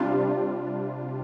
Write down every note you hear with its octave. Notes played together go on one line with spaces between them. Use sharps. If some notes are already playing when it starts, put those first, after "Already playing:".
Already playing: C3 G3 D4 F4